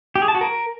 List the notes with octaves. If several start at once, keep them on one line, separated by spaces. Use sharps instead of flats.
G4
G#4
A5
F#4
A#4